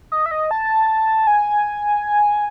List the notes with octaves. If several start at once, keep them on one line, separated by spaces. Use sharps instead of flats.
D#5
E5
D#5
A5
G#5